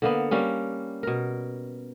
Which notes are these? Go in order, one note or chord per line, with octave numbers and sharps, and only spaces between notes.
D3 A#3 B3
G3 A#3 C#4
B2 A#4